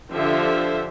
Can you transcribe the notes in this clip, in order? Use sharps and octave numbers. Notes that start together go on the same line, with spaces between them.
D3 F3 G4 C5 E5